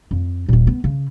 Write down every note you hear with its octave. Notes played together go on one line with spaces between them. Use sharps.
F2
D#1 A#2
B3
C#3